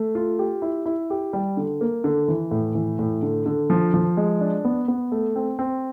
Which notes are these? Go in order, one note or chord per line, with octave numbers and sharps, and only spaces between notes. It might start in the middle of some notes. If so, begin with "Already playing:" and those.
Already playing: A3
F4
G4
E4
E4
G4
G3
D3
A#3
D3
E3
A2
E3
A2
D3
D3
F3
F3
G#3
D4
B3
B3
A3
C4
C4